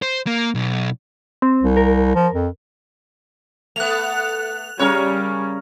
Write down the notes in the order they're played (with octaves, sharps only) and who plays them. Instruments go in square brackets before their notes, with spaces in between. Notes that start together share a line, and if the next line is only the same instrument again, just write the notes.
[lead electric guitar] C5
A#3
B1
[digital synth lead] C4
[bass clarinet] C2
[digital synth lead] A#4
[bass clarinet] F3
F2
[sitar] A3 B3 [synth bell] F#6 F7
[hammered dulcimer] C#3 C#4 A#4 [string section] G3 [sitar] C#5